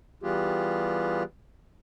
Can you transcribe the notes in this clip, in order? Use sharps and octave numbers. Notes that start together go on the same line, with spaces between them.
E3 G3 B3 F4 G4 G#4